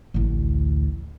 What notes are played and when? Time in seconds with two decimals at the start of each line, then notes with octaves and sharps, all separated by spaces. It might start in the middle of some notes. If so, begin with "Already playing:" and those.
0.14 A1 D2